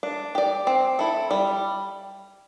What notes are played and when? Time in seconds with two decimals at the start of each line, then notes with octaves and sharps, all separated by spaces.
0.03 D4
0.35 G4 D5
0.67 C4
0.99 E4 A4
1.31 G3